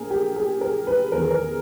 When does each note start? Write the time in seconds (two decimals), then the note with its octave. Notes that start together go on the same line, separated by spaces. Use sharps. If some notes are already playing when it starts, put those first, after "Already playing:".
Already playing: A#1 A#2 G#4 A#4
0.10 G4
0.36 G#4
0.61 A#4
0.87 B4
1.12 E2 D#3 A#4
1.22 G#4
1.31 A#4